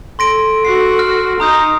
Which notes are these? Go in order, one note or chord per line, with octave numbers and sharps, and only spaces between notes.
A4 C6 A#6 D7
F#4 C7
F6
D#4 A#5 D#6 G6